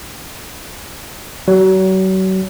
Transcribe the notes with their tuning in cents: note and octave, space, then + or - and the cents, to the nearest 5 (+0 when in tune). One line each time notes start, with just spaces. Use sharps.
F#3 +35